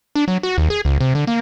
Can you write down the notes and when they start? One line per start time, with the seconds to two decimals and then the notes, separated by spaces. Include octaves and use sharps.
0.15 D4
0.28 F#3
0.43 F#4
0.58 D#2
0.70 G#4
0.85 C#2
1.01 C3
1.15 D3
1.27 A#3